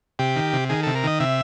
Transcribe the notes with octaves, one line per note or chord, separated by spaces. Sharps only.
C3 G4
D#3
C3
D#3 G#4
C3 A4
A#4
D#3 D#5
C3 E5